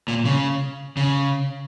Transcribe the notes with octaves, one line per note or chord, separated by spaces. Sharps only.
A#2
C#3
C#3